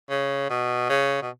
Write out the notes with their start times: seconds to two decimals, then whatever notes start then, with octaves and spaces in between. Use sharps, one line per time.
0.10 C#3
0.50 B2
0.90 C#3
1.22 B2